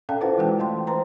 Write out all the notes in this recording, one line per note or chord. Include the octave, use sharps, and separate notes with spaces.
C#4 A4 D5 F5 G5 A5
E4 F4 A4 B4 C5 F#5
E3 G#3 F#4 G5 A5
A3 D#5 G5 C6
E3 G#3 B4 C5 A#5 C6